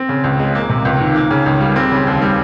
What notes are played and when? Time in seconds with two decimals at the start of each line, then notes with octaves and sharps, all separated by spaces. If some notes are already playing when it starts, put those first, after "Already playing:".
Already playing: C4
0.09 C#3
0.24 C#2
0.39 G#3
0.55 A#3
0.69 C3
0.85 C#2
1.00 D#3
1.16 A#3
1.31 C#3
1.46 C#2
1.61 G3
1.76 C4
1.91 C#3
2.07 D#2
2.22 G3